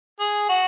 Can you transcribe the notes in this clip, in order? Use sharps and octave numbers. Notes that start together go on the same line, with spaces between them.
G#4
F#4